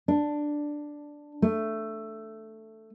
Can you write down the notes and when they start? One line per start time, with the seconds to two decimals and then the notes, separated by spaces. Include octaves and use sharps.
0.08 D4
1.42 A3